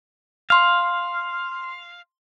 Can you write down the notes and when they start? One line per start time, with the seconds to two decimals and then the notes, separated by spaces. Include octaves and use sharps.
0.50 F5 C6 F6